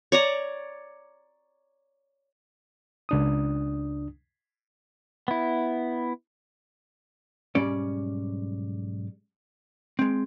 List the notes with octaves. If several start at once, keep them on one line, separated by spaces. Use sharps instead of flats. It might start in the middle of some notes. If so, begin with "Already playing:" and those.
C#5 D5 A#5
C#2 D4 D#6
B3 E4
B1 G#2 G3 C#4 D5
G#3 C4